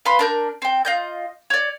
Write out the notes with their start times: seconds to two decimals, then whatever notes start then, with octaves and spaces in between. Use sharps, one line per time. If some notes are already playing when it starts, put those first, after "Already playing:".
0.05 B4 F5 B5 C6
0.19 D4 A#4 G6
0.62 C4 G5
0.85 F4 D#5 G6
1.50 C#5 D5